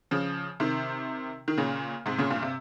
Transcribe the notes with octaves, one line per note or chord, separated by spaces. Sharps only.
C#3 F3
C3 D#3
D#3
A#2 C#3
G#2 C3
A#2 C#3
G2 A#2
C3